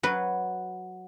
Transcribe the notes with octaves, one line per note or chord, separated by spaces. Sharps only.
F#3 B4